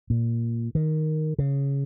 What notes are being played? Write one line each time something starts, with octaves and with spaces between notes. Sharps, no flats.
A#2
D#3
C#3